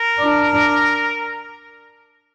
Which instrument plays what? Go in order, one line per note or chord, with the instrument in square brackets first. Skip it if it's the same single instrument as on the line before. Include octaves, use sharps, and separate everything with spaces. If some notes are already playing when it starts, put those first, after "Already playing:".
Already playing: [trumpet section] A#4
[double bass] D4